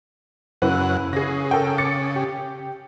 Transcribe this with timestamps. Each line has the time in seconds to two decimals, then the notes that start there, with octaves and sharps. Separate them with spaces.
0.62 F#2 C#3 E4 B4 F#5
1.13 C#3 G#4 A#6
1.51 A4 A#4 G5
1.78 D6 A6 C#7
2.16 G4